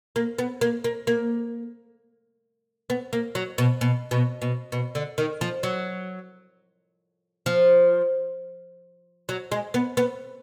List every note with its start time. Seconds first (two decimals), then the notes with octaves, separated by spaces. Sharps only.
0.16 A#3
0.38 B3
0.61 A#3
0.84 A#3
1.07 A#3
2.90 B3
3.13 A#3
3.35 F#3
3.58 B2
3.81 B2
4.11 B2
4.42 B2
4.72 B2
4.95 D3
5.18 D#3
5.41 F3
5.63 F#3
7.46 F3
9.29 F#3
9.52 G#3
9.74 B3
9.97 B3